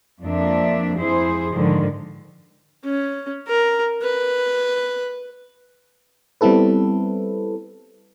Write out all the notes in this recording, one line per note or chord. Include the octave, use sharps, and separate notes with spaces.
F2 F3 A#3 D4 E5
F2 E4 G#4 C5
G#2 D3 D#3 F3
C#4
A#4
B4
G3 B3 C4 E4 A4 B4